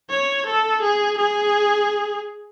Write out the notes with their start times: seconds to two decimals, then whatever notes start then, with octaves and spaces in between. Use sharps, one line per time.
0.10 C#5
0.46 A4
0.82 G#4
1.18 G#4